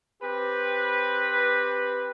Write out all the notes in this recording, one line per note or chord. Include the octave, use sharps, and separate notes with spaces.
C4 G4 B4